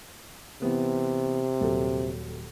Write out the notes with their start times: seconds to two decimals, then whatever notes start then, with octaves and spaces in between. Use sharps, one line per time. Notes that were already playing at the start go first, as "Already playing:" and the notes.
0.62 C3 E3 B3
1.61 D#1 F#3 A4